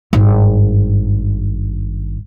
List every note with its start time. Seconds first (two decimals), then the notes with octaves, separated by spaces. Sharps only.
0.13 G#1 G2